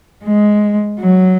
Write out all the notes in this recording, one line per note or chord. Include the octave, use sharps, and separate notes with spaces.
G#3
F#3